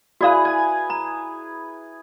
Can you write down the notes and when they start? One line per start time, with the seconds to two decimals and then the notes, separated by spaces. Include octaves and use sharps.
0.21 E4 F#4 G#4 B4 D5 F5
0.45 G#5
0.90 A#5